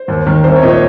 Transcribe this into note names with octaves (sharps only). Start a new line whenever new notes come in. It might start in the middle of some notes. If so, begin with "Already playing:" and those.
Already playing: C5
D#2
D#3
C2 C5
C#5
A#2 F3 D#5
C#5